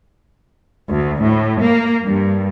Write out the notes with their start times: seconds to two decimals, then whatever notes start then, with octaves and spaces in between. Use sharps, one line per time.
0.89 D2
1.22 A2
1.64 A#3
2.06 G2